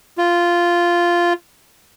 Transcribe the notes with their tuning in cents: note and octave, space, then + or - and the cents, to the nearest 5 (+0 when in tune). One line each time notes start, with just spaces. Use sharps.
F4 -5